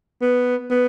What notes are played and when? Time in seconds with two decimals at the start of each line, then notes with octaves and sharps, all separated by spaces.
0.21 B3
0.70 B3